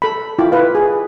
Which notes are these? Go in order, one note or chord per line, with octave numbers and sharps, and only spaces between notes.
A4 B5
E4 F4 G5 D6
E4 B4 F5
G#4